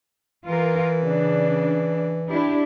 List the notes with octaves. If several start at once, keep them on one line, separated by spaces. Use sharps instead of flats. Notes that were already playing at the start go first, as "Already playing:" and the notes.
E3 F4 A#4
C#3 D4
D4 E4 G4